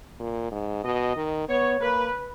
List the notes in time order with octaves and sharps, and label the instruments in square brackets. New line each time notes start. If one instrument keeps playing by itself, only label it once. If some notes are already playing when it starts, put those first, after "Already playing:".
[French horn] A#2
G#2
[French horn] B2 [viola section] D#5
[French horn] D#3
[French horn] B3 [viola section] C#5
[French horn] A#3 [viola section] B4